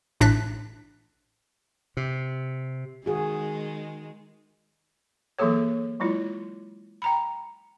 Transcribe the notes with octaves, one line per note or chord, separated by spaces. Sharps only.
A1 A2 D4 F#6 A6 B6
C3
D#3 G#3 F#4 G#4
E3 F#3 A#3 G#4 A4 C#5
F#3 G#3 E4 F4
G5 A#5 B5